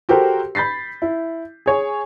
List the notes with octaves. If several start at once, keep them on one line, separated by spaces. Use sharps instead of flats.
F#4 G4 A4 A#4 C5
B5 G6 A6 B6 C7
E4
G#4 C#5 G#5